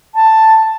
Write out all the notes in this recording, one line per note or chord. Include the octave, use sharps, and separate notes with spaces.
A5